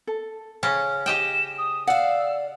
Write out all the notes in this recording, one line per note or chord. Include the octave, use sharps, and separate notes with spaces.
A4
C#3 C#4
G4 D#5 G5 E7
D#6
D5 F5 F#5 E6